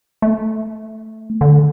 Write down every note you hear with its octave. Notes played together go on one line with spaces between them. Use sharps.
A3
D3